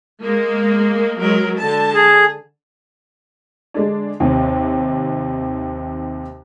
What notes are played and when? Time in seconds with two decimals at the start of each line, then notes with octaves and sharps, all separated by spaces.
0.23 G#3 A#3
1.19 F#3 G#3 A#4
1.57 D3 A5
1.94 G#4
3.74 D3 G#3 D4
4.20 D#2 C3